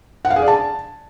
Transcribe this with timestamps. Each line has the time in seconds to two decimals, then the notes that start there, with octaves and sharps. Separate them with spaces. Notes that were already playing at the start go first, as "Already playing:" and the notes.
0.25 F#5
0.30 F5
0.36 G#4
0.42 D5
0.48 A5